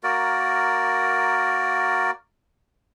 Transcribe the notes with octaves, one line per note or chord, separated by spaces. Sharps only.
A#3 F#4 A#4 D5